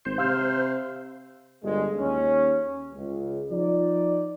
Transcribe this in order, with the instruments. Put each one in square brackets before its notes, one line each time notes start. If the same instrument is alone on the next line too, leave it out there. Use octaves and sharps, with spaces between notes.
[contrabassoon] G#1 [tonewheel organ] C5
[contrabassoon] C3 [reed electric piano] F5 E6 F6
[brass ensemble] G1 G2 G#3
D#2 C#4
C#2
F3 D#4 D5